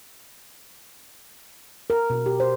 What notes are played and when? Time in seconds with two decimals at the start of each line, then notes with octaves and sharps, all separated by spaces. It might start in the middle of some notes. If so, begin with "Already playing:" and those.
1.90 A#4
2.10 B2
2.26 G4
2.40 C5